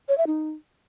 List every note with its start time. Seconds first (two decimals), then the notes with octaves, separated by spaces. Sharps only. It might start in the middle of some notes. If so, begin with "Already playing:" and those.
0.09 C#5
0.18 E5
0.27 D#4